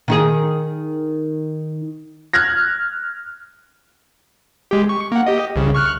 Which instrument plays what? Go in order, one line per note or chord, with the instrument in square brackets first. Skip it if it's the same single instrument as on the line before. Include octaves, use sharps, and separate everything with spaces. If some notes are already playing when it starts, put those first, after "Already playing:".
[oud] D#3 D#4 G#4
[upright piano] F6 F#6 G#6 A#6
[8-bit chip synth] G#3 G4
C#6
A#3 F#5
G4 D#5
C2 C#3
C#6 F6 F#6